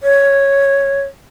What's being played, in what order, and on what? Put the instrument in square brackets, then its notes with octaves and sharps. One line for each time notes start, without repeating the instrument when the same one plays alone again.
[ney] C#5